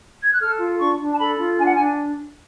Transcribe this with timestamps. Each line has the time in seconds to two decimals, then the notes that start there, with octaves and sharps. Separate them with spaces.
0.23 G#6
0.32 F#6
0.40 A4 F6
0.59 F4
0.79 D4 C#6
0.99 D4
1.13 A5
1.19 A4 B5
1.39 F4
1.58 D4 G#5
1.67 F#5
1.75 G#5
1.78 D4